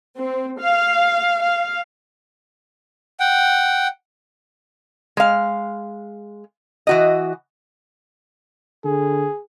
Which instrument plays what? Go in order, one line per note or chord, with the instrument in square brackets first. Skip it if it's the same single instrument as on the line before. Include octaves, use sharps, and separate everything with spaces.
[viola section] C4
F5
F5
[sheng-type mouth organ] F#5 G5
[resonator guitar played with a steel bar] G#3 F5
E3 F#4 D#5
[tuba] D3 [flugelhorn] G#4